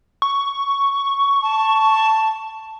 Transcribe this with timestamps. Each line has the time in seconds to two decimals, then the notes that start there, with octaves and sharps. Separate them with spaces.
0.22 C#6
1.42 A5